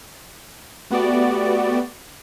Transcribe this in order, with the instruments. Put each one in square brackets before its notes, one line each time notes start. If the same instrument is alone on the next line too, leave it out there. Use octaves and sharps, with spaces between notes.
[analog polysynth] A3 B3 F#4 G4 D5